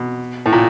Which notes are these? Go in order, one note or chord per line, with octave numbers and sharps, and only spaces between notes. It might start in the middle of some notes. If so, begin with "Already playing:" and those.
Already playing: B2
A2
A#2